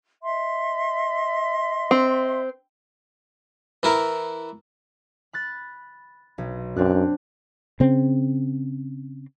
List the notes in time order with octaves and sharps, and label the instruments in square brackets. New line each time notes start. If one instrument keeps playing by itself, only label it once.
[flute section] D#5 E5 C6
[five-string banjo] C4
[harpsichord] E3 E4 A#4
[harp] B5 F#6 A6
B1
[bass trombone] F#2 [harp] C4 D4 F#6
[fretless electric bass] C#3 C4